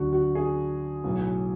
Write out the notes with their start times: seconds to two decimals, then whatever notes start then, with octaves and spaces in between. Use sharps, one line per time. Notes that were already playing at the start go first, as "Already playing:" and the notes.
Already playing: D2 D3 F#3 F#4
0.13 F#4
0.35 G#4
1.04 B1 A2 F#3 B3